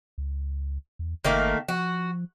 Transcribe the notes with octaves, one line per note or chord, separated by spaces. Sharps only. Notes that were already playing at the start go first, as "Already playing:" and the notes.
C#2
E2
G1 D#3 A3 A#3
F3 F#4